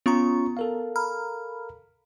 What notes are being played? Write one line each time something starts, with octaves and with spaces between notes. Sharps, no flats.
B3 C#4 F4 A#5 C#6
A4 A#4 F5
A#5 B5 F6